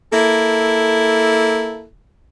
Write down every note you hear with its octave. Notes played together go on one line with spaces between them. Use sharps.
A#3 E4 A4